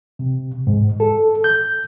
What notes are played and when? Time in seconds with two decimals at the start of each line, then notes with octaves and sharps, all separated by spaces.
0.19 C3
0.67 G#2
1.00 A4
1.44 G6